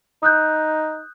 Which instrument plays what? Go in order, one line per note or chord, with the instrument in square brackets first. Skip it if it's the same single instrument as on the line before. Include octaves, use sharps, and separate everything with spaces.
[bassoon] D#4 [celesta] D#6 F#6 G6